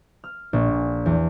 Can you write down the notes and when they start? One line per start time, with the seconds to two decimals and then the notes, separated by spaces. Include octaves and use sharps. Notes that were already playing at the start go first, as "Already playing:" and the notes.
0.24 F6
0.53 A#1
0.69 A#2
1.06 E2